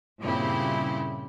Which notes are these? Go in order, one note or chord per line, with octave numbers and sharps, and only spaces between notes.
G2 A#2 C#3 C4 E4 G4